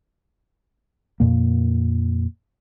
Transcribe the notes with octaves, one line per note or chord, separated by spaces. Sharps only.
F2 A#2 A#3